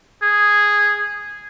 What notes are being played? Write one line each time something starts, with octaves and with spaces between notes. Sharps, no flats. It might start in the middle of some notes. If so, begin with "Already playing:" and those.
G#4